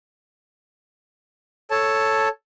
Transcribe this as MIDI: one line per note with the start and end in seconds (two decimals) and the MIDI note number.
1.71 2.29 69
1.71 2.29 73
1.71 2.29 81